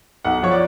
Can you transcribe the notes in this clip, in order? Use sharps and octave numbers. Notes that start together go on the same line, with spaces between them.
B1 F#5
F3 C#5
D5